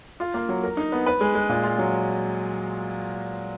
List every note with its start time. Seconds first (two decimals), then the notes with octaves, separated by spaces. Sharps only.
0.20 F4
0.34 A#3
0.49 F#3
0.64 A#4
0.77 D#4
0.92 B3
1.06 B4
1.21 G#3
1.35 G#3
1.49 A#2
1.64 F4
1.78 F#3